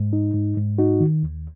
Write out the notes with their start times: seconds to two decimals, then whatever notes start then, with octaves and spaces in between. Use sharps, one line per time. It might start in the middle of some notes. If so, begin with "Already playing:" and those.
Already playing: G#2
0.13 D#4
0.34 G#2
0.57 G#2
0.78 D#4 F#4
1.00 D#3
1.23 D#2